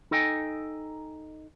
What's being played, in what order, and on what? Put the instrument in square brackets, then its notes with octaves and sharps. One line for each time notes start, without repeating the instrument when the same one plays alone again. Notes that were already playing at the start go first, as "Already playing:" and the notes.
[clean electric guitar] D#4 A4 D#5 G5 G#5